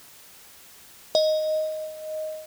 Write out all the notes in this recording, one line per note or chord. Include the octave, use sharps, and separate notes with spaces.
D#5